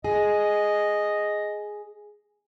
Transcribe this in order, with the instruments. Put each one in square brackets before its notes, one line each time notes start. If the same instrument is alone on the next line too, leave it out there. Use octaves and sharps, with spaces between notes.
[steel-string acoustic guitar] G#4 [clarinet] D#5